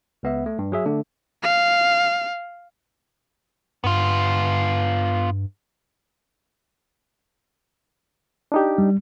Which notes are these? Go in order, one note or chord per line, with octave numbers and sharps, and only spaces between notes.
C#2 B3 E5
A3
G2
F#3 G#4 E5
D3 A3 D4
F5
G2 B3 F4
D4 D#4 G4
G3